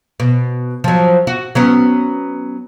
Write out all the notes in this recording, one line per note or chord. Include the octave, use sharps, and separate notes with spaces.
B2
F3 F#3
F#4
F#3 B3 C#4